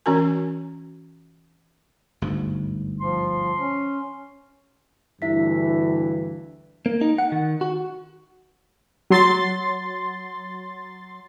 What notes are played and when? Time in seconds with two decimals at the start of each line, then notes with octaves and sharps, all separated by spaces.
0.06 E3 C#4 F#4 A#4 G#5
2.22 G1 D2 G#2
3.01 F3 C6
3.59 C#4
5.22 D2 G2 E3 E4 E5 B6
6.86 A#3
7.01 D#4
7.18 F#5
7.32 D#3
7.61 F#4
9.10 F#3 C6 A6